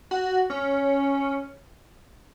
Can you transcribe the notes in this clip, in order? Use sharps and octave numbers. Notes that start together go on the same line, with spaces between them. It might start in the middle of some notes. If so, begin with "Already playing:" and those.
F#4
C#4